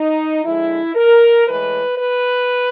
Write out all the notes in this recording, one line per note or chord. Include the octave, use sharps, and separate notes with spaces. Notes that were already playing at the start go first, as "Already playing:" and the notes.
Already playing: D#4
D3 F3 G#3 E4
A#4
A2 E3 G#3 B4
B4